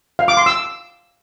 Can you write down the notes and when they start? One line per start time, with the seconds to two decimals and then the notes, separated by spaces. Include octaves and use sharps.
0.19 F5
0.28 D6
0.37 C6
0.46 E6